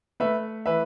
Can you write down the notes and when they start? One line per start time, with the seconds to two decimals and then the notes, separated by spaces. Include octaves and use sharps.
0.20 A3 B4 E5
0.66 E3 B4 E5